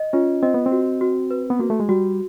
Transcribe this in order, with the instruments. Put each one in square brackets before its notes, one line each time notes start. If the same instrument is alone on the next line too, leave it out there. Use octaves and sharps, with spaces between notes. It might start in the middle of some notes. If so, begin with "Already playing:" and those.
Already playing: [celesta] D#5
[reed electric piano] C#4 [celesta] F4
[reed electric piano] C4 [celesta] D#5
[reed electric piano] B3
C4
[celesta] F#4
F#4
B4
[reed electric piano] B3
[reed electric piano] A#3 [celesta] F#4
[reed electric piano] A3
G#3
[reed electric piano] G3 [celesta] F#4